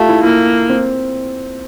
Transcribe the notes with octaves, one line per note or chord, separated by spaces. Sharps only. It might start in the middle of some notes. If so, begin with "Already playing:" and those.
Already playing: A3 F4 G4
E4
A#3 E4
C4